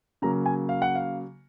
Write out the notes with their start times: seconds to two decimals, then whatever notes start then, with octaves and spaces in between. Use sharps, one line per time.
0.22 C#3 F#3 A#3 A#5
0.46 G#5
0.69 F5
0.82 F#5
0.95 F5